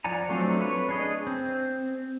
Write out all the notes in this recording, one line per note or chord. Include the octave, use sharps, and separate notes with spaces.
F3 D5 F#5 G#5 A#5
F#3 A3 C4 D4 F4
B4 C#5
D4 G#4 D#5
C4